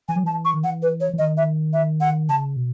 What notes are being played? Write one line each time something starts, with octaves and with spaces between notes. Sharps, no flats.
E3 G#5
F#3
E3 A5
C#6
D#3
E3 F#5
B4
C#5
E3
D#3 D#5
E5
E5
F#5
C#3 A5
B2